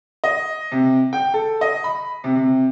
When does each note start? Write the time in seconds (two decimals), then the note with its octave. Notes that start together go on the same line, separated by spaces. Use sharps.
0.24 D#5
0.72 C3
1.13 G5
1.34 A4
1.61 D#5
1.84 B5
2.24 C3
2.36 C3